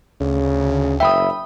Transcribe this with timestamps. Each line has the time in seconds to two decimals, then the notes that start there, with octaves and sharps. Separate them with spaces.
0.20 D2 C#3
1.00 F#1 E5 G5 B5 D#6